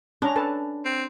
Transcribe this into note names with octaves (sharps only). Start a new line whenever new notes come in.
C#4 D4 A#5
A4 B4 A5
C4